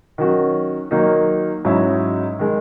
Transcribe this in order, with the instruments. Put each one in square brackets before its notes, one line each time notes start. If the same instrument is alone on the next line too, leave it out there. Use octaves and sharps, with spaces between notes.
[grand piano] D#3 F#3 C#4 F#4
D#3 F#3 A#3 D#4
G#2 F#3 C#4 E4
D#3 G#3